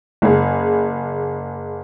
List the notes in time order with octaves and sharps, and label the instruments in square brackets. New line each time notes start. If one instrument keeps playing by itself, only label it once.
[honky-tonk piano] F#1 G#4